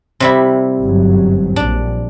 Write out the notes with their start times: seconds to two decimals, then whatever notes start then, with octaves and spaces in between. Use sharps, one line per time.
0.20 C3 G3 E4
0.81 G1 F#2 F#3
1.56 A#1 D4